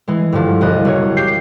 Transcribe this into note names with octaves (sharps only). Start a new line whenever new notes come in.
E3 G#3
G2 D3 F3
E1 C2 D#5 F#6
F#1 C#5
G4 G6 C7